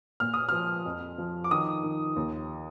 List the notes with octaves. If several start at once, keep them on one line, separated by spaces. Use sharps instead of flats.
A#2 F6
D#6
F3 F6
F2
F3
D6
D#3 D#6
D#3
D#2